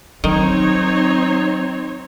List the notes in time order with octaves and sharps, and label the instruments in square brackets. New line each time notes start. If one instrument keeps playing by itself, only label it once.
[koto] D#3 [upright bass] F#3 [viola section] C4 D#4 C#5